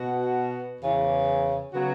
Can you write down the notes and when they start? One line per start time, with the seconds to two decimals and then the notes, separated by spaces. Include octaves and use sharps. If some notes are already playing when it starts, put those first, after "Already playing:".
Already playing: B2 B3 F#4
0.81 E2 C#3 E3
1.73 C#3 F#3 B3 F#4